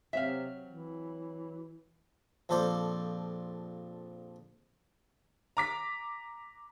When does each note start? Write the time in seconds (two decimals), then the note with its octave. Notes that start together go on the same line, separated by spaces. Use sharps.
0.13 C3 F#3 C4 E5 F5
0.68 E3
2.49 A#1 F2 A4 C5 D5 F5
5.57 A#5 D6 B6